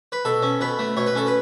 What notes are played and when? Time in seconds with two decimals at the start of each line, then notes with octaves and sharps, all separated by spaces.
0.12 B4
0.25 B2 A4
0.42 C#4
0.61 B2 B4
0.79 A3
0.97 B2 C#5
1.06 B4
1.15 C#4 A4
1.26 B4